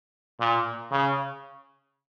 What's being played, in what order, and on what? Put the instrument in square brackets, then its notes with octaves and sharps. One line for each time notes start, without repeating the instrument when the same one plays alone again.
[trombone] A#2
C#3